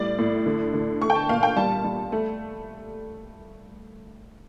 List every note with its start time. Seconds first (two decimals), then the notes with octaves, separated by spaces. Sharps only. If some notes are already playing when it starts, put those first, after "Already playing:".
Already playing: A2 G3 D5
0.19 A2
0.46 D3
0.73 D3
1.01 A3 C#6
1.10 G5
1.15 A5
1.29 A#2 F5
1.43 G5
1.56 G3 A5
1.84 G3
2.12 A3